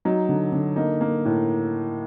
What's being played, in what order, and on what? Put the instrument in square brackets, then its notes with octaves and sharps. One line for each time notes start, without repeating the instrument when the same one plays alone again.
[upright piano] F#3 D#4
D3
D3
A#3 D#4
A#3
A2